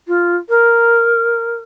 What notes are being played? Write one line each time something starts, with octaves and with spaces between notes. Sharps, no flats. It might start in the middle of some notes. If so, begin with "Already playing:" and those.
F4
A#4